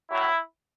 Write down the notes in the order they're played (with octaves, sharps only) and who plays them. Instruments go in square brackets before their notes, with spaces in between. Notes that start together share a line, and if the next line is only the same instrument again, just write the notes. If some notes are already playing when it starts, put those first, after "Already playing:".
[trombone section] A2 F#3 E4